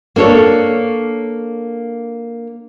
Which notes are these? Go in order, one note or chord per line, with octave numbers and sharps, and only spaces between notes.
A#3 D4 A4 C#5